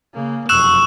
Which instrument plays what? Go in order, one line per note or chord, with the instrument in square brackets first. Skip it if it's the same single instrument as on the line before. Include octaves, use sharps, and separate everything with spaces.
[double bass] C#3 A#3
[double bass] F1 F#2 [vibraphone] C#6 [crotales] E6 F#6 E7